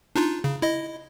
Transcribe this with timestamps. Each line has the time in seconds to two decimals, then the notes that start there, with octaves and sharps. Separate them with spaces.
0.16 D4 D#4 F4
0.44 C#3
0.62 E4 D#5